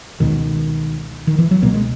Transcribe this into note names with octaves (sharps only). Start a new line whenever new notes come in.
C#2 B2 D#3
D#3
E3
F#3
C#2 B2 A#3
G#3